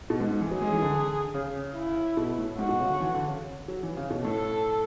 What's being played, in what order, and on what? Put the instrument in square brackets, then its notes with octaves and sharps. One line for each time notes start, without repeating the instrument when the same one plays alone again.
[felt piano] B2
G#2
G#2
E3
[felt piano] F#3 [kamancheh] G#4
[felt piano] G#3
E3
D3
C#3
[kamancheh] E4
[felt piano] B2
A2
[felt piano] G#2 [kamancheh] F#4
[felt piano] B2
C#3
D3
E3
D3
C#3
F#3
E3
C#3
B2
[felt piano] A2 [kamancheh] A4